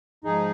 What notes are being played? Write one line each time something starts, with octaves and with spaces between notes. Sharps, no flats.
G#2 F3 D#4 G#4